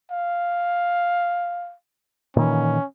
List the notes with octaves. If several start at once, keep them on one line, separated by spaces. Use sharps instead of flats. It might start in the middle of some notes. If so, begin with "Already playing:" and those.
F5
A#2 D#3 E3 C#4